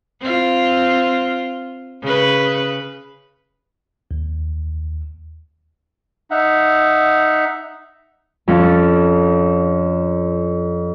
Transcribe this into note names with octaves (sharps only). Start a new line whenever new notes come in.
C4 F4
C#3 B4
D#2
D#4 E5 F#5
F2 C#4 A6